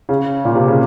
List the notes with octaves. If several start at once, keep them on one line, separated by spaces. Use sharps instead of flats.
C#3
A#2
C3
C#3